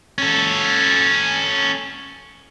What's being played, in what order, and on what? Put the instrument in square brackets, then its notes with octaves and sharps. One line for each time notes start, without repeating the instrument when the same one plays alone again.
[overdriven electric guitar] C#4 A4